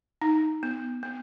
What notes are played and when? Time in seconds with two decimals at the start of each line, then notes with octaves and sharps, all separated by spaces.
0.21 D#4
0.63 B3
1.03 B3